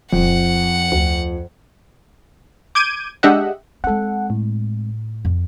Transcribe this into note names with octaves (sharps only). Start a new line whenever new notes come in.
D#1 F2 F#5
D2
D6 G6 G#6 D7 D#7
G#3 D4 G4 D#5 E5 F#5
G#3 C4 A4 F#5
A2
F2